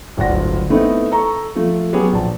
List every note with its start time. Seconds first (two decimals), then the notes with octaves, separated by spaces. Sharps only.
0.17 D1 G1 D5 F#5 A#6
0.70 A3 B3 C4 D#4 E4
1.12 A4 A#5 C#6
1.55 F3 A3
1.93 F#3 B3 C#4 G4 G#4
2.13 A#1 A5